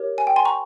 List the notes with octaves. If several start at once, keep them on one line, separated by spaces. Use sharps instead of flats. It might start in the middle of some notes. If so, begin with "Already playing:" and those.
Already playing: G4 A#4 C#5
G#5
G5
G#5 C6
A#5 C#6